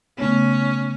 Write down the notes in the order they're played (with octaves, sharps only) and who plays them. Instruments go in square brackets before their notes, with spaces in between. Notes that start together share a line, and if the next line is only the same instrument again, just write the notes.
[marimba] C#3 A3 B3 [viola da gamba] C#4